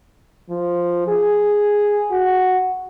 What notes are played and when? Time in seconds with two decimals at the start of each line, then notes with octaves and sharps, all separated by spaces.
0.49 F3
1.08 G#4
2.11 F#4